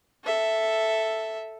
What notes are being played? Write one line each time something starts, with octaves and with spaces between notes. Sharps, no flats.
A4 E5